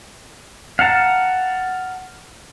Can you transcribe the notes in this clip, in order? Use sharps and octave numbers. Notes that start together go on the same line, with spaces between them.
F5 F#5 A5 A#5